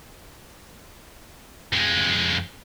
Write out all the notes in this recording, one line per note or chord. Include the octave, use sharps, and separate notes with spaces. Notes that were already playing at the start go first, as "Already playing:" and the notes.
F2 G#3